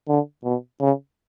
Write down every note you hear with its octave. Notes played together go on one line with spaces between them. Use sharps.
D3
B2
C#3